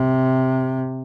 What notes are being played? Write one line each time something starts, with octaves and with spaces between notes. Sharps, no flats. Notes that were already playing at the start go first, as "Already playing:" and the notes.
Already playing: C3